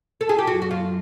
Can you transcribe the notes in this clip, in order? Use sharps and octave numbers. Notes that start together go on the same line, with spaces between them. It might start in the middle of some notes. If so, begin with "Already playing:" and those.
A4
G#4
G4
F#2 F#4
F#4
F4